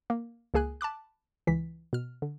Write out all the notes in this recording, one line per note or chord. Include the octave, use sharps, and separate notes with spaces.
A#3
C#2 A#3 G#4 G#5 F#6
A5 B5 D6 F#6
C#2 E3 B6
B2 F6
D3